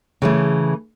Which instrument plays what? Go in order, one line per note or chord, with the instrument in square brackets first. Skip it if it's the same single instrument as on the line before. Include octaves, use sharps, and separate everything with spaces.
[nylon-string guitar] C#3 E3 A3